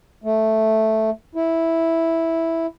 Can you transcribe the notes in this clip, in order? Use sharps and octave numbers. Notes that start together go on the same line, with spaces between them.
A3
E4